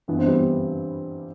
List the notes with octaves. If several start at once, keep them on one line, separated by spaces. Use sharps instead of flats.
G2 E3 B3
C4
G3 B3